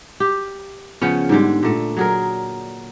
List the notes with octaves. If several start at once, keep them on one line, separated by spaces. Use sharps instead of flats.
G4
C#3 F3 B3 C#4
G#2 D3 G3 G#3
A#2 A3
F#3 G#4 A#4